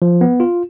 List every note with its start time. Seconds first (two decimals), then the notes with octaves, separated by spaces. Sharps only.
0.02 F3
0.21 B3
0.40 F4